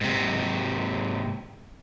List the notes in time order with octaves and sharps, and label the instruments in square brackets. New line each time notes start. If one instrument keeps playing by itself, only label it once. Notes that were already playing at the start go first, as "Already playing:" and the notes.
[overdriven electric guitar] G#2 C3